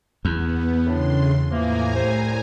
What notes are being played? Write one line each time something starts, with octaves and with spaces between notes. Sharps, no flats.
E2 B3
A2 C#3 D4 C6
A2 E3 F3 A#3 G#5 A#5
C2 C5